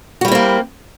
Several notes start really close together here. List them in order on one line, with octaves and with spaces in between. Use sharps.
F#4 G3 E4 C4 A#3